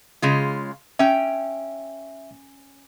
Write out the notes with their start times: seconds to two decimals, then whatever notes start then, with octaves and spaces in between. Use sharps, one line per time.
0.22 C#3 G#3 F4
0.99 C#4 E5 G5